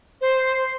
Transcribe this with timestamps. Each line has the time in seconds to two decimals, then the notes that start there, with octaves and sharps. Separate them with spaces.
0.21 C5